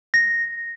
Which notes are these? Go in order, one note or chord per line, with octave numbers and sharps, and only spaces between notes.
A#6